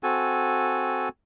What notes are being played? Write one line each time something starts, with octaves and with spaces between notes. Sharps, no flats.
C4 F#4 A4 G#5